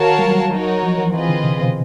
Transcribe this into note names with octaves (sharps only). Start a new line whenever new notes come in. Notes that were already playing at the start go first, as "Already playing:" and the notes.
Already playing: D#3 F#4 A#4 C#5 F5 A5
G3
F#3
D#4 F#4 A#4 C#5
F3
E3
E3 C4 F4 G#4 B4 D#5
D3
C3
B2